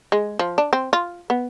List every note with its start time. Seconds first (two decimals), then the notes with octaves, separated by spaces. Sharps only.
0.12 G#3
0.39 F3
0.58 D4
0.73 C4
0.93 F4
1.30 B3